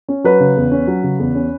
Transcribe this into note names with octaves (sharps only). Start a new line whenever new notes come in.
C#4
F#3 B4
C#3
E2
C#4
F#3
C#3
E2
C#4